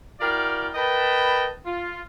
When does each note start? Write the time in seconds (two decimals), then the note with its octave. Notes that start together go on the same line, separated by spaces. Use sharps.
0.21 E4 F#4 A#4 D5 F5 G5
0.74 A#4 B4 D#5 G5 A5 B5
1.66 F4